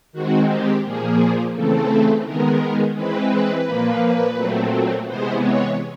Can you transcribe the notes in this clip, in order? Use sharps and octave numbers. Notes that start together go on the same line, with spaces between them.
D#3 G#3 C4 F#4
G4
A#2 F3 A#3 G#4
C#3 E3 A3 C4 A4
D#3 G#3 B3 A#4
E3 G#3 C4 B4
A#2 F3 A#3
A#2 F#3 A3 C4
C3 E3 G#3 B3 C5
C#5